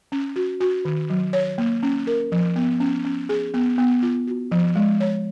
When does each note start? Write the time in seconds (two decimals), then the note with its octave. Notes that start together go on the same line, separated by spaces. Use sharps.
0.12 C#4
0.36 F#4
0.60 F#4
0.85 D#3
1.10 F#3
1.33 C#5
1.58 A#3
1.83 C#4
2.07 A#4
2.32 F3
2.56 B3
2.80 C#4
3.05 C#4
3.29 G#4
3.54 B3
3.78 B3
4.03 F4
4.27 F#4
4.51 F3
4.75 G#3
5.00 C#5